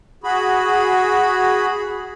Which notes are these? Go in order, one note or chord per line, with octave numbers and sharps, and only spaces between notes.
F#4 G#4 B5